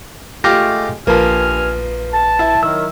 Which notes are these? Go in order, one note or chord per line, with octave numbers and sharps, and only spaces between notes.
G#3 A3 F4 G4 A4 D6 A#6
A#1 G2 F3 A#3 B4 G#5 F6
A5
E4
D#3 F#3 E6